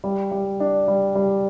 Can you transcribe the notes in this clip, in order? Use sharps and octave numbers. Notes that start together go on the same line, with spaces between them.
G3
G3
D4
G3
G3